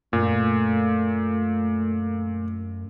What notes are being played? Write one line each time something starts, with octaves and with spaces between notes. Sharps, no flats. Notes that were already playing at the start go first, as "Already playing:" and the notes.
F#2 A#2 A3